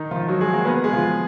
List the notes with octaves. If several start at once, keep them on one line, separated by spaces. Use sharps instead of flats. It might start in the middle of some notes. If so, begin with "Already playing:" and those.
Already playing: D#3 D#4
F3 F4
F#3 F#4
G#3 G#4
A#3 A#4
B3 B4
G#3 G#4
F3 F4